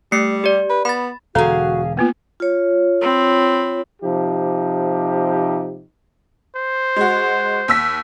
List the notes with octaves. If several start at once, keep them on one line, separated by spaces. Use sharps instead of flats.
G3 A3 C7 C#7
G4 D5
B4
B3 B5 A6
E1 D3 F#4 G#4 A4 F5 A#5
A#3 B3 F4 B4
F4 C#5
C4 B5
C3 F3 D#4 G4
C5
G#3 F#4
D#2 E6 B6